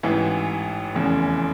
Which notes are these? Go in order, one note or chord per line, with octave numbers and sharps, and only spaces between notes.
A1 G#2 E3
F1 E2 C#3